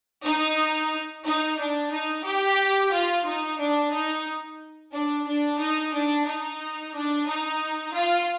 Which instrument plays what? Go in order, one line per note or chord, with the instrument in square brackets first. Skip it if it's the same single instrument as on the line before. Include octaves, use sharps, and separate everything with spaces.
[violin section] D#4
D#4
D4
D#4
G4
F4
D#4
D4
D#4
D4
D4
D#4
D4
D#4
D4
D#4
F4